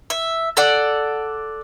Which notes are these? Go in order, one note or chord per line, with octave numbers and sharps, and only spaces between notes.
E5
A4 D5 F#5